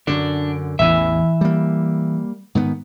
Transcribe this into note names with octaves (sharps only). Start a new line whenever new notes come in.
F#2 D3 D4
A1 E2 E3 E5
G3 A#3
G#2 D#3 B3